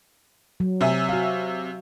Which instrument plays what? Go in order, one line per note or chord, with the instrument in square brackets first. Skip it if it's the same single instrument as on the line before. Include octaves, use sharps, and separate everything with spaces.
[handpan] F#3
[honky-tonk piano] C3 E5 G#5
[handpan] F#4 F5